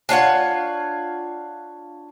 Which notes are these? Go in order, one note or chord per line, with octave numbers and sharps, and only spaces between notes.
D4 F4 C#5 F#5